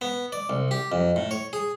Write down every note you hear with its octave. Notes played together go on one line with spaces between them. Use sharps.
B3
D5
C2
G4
F2
A2
C#5
G#4